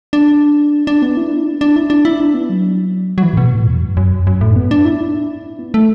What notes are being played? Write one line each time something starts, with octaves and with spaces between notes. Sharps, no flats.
D4
D4
B3
E4
D4
E4
D4
D4
E4
D4
E4
D4
B3
F#3
F#3
E3
A2
B2
A2
E2
F#2
F#2
F#2
A2
B3
D4
E4
D4
E4
B3
A3